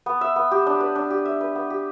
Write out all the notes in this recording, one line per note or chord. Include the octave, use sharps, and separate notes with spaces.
B3
E5
B3
G4
D4
B4
D4
G4
E5
B4
B3
G4